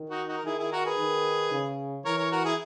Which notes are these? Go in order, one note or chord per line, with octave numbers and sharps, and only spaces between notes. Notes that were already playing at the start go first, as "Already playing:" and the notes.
Already playing: D#3
D#4 F#4
D#4 F#4
A#4
D#3 E4 G#4
E4 G#4
F#4 A#4
G#4 B4
D#3
C#3
E3 A#4 C#5
A#4 C#5
F#4 A#4
E4 G#4